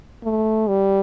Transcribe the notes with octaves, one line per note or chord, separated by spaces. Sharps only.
A3
G3